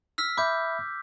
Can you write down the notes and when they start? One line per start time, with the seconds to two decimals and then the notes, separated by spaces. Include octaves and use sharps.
0.18 E6 F6 B6
0.38 E5 B5 D6 G6